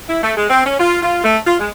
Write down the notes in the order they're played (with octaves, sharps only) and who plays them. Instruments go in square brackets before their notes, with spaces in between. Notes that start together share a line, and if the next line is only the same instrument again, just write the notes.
[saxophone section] E4
A3
G#3
C4
C#4
F4
F4
A3
F4
G#3